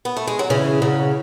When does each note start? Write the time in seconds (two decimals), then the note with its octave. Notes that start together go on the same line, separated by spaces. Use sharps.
0.05 B3
0.17 A3
0.27 G#3
0.39 F#3
0.50 C#3 E3
0.82 C#3 F#3